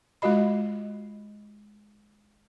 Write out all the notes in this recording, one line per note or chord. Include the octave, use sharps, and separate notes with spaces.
G#3 F4 F#4 D#5 B5